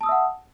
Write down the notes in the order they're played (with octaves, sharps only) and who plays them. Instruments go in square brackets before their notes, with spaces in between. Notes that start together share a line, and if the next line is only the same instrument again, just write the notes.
[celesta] A5
D#6
E6
E5
F#5